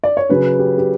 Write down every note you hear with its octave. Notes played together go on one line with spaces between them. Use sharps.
D5
C#5
C#3 F#3 C#4 B4
G4
G4